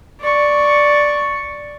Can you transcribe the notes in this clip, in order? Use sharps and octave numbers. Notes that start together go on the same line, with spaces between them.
D5 C#6